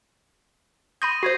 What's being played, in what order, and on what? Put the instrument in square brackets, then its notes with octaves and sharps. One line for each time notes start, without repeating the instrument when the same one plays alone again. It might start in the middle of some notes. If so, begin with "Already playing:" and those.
[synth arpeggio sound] B5 C6 G6 [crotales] D#6 A#6 D#7
[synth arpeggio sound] F#4 C5 [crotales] G6 G#6 C7